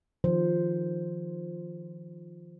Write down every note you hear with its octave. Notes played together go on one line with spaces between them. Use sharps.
D#3 F3 C5